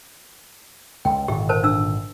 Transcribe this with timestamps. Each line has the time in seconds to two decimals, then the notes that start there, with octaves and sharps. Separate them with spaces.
1.05 C#2 G5
1.28 G#1 A#2 D3 G4
1.49 A#4 C5 A5
1.63 D4 E6